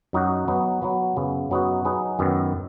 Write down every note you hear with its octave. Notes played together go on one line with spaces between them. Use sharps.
F#2 F#3 D#4 F#4
F#3 B3 D#4 B4
F#3 B3 F#4 B4
F#2 C#3 B3
F#2 F#3 B3 D#4 F#4
F#3 D#4 G#4 B4
F#2 D#3 B3